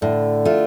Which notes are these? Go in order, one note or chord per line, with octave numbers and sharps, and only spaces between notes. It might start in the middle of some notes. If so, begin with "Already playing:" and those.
A2 D3
A3 F4